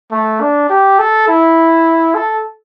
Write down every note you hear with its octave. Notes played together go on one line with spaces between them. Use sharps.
A3
D4
G4
A4
E4
A4